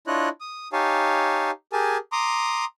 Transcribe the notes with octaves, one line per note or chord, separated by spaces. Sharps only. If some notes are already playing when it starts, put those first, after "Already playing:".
D4 E4 F4 C#5 D#5 F#6
D#6
D#4 G4 C#5 F5 G#5 A5
G4 G#4 A#4 G#5 A5
A#5 C6 D6 D#6